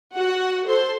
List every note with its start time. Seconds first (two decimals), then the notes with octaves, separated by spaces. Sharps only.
0.14 F#4 F#5
0.67 A4 C5 C6